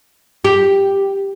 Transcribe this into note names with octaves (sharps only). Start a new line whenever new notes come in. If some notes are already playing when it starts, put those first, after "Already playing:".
G4